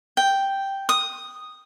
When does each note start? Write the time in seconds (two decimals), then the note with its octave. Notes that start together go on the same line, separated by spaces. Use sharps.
0.17 G5
0.89 D#6